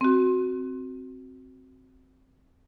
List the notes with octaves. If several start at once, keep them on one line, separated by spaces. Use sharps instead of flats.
C4 F#4